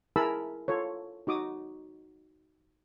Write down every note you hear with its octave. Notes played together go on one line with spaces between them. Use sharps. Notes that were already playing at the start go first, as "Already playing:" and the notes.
E4 G#4 A#4 A5 B5 E6
F4 A4 C#5
D#4 F#4 D6 D#6